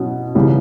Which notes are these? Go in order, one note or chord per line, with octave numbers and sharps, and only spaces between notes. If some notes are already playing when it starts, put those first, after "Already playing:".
Already playing: B2 F#3 C#4 E4
C#2 C#3 E3 G3